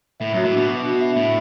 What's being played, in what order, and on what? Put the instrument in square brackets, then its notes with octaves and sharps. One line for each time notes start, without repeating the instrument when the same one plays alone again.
[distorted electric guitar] A2 [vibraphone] E5
[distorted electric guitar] F#2 [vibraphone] F#4
[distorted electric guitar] A2
[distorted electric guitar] B2 [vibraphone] D4
[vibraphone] D4
F#4
E5
[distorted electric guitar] A2 [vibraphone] E5